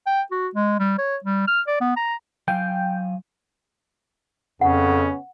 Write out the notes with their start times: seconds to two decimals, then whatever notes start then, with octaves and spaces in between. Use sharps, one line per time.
0.07 G5
0.32 F#4
0.55 G#3
0.80 G3
0.98 C#5
1.24 G3
1.48 F6
1.68 D5
1.81 B3
1.96 A#5
2.48 F#3 F5 G5 G#5
4.61 F2 C#3 B3 C#4 F#5